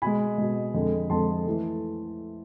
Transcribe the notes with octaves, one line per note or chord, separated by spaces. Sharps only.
B2 G#3 G#5 B5
B2 G#3
F2 D3 G#3
F2 D3 G#3 A5 C6
E3 A3